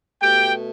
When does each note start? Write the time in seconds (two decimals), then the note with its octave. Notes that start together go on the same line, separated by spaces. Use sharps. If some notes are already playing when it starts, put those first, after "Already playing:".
0.22 B2 A3 G4 G5